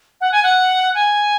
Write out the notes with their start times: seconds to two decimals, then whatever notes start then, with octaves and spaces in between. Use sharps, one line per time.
0.21 F#5
0.32 G#5
0.43 F#5
0.95 G#5